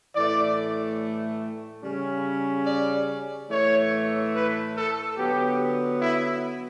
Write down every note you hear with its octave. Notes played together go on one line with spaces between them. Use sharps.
A2 E3 A3 D5
C#3 G3 C#4
D5
A2 E3 A3 C#5
B4
A4
D3 F#3 B3 G4
E4